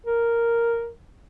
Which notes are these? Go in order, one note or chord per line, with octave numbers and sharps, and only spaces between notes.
A#4